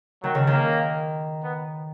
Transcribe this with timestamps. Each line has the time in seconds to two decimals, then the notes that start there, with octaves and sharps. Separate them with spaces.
0.23 D#3 F#3
0.35 C#3
0.47 D#3
0.53 A#3
1.43 B3